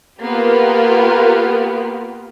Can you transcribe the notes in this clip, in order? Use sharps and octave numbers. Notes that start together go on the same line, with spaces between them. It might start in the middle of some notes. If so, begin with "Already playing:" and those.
A#3 B3 F4 G4 A#4